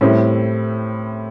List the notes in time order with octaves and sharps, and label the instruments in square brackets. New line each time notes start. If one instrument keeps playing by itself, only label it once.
[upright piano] A2 G3 C4 E4